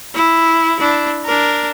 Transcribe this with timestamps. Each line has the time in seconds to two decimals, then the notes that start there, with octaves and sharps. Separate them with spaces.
0.15 E4
0.80 D4 E4
1.25 D4 A#4